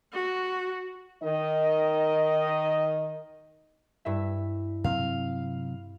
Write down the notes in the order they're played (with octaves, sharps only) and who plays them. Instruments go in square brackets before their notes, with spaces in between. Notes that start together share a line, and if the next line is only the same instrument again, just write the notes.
[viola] F#4
[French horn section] D#3 D#5
[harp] G2 E4 E5
[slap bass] C3 F#3 C4 [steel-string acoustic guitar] F5